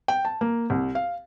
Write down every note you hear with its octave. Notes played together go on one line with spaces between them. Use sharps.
G5
A5
A#3
C2
F5